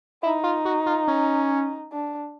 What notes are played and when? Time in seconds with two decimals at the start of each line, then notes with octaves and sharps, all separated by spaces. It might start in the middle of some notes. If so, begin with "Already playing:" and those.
0.23 D#4 E4
0.43 F4
0.65 F#4
0.86 F4
1.08 C#4
1.92 D4